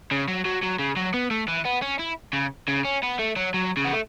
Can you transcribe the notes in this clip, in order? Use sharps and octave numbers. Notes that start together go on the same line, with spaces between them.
C#3
F#3
F#3
F#3
C#3
F#3
B3
A3
E3
B3
C#4
E4
C#3
C#3
C#4
B3
A3
F#3
F#3
C#3
B3
A3